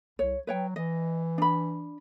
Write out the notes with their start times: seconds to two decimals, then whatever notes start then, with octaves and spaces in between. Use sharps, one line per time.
0.19 C2 C#5
0.47 F#3 B4 C#5 G5
0.76 E3 D#5
1.38 D4 B5